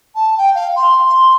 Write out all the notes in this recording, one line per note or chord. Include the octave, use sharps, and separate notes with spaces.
A5
G5
F5
C6
C6